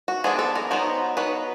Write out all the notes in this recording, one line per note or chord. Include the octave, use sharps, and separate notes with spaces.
F#4
F3 G#3 B3 D4 G#4
A4
A#4
F#3 B3 D#4 C5
F#3 B3 D#4 B4